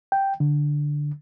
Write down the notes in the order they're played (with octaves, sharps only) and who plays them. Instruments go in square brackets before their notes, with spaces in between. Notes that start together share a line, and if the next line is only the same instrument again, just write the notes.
[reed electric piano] G5
D3